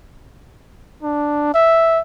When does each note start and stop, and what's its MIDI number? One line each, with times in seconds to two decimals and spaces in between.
1.03 1.53 62
1.54 2.00 76